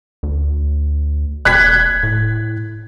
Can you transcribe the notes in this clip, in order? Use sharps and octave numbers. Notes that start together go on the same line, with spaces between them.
D2
E1 F#6 G#6 B6
A2